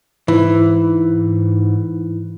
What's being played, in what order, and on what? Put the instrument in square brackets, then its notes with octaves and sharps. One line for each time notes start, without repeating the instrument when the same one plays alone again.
[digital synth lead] G#2 [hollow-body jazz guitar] E3